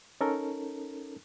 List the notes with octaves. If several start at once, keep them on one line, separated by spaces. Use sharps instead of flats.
C#4 D#4 A4 A#4